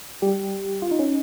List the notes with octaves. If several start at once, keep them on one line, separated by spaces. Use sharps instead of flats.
G3 G4
F4
D#4
C#4